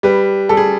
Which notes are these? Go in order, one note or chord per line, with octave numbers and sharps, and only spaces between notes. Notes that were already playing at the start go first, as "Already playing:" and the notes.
G3 B4
G3 A4
G#4